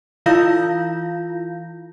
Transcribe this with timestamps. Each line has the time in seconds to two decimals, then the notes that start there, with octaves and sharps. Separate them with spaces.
0.26 E3 E4 F4 F5 G6 A#6